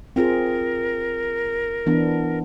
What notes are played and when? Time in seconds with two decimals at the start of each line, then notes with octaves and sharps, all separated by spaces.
0.16 C4 F4 G#4 A#4
1.86 E3 B3 D4